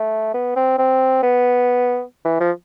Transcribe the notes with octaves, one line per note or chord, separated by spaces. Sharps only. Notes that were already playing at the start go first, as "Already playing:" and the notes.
Already playing: A3
B3
C4
C4
B3
E3
F3